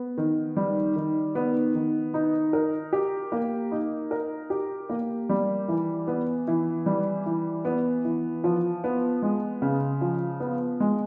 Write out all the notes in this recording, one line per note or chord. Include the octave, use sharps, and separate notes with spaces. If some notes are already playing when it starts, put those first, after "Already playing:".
Already playing: B3
D#3
G3
D#3
B3
D#3
D#4
A#4
G4
A#3
D#4
A#4
G4
A#3
G3
E3
B3
E3
G3
E3
B3
E3
F3
B3
G#3
C#3
F3
B3
G#3